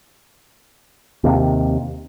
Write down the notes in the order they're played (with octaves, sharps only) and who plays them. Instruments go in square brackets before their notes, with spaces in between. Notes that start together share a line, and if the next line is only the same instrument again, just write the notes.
[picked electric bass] D#2 C3